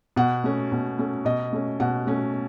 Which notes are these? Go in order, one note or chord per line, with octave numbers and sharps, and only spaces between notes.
B2 F#5
A3 C#4
B2
A3 C#4
B2 D#5
A3 C#4
B2 F#5
A3 C#4